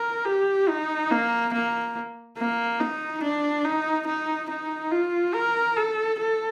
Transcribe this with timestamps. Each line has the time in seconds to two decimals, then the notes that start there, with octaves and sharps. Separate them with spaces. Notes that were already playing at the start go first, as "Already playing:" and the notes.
Already playing: A#4
0.26 G4
0.69 D#4
1.11 A#3
1.53 A#3
2.38 A#3
2.80 D#4
3.23 D4
3.65 D#4
4.07 D#4
4.50 D#4
4.91 F4
5.34 A#4
5.77 A4
6.19 A4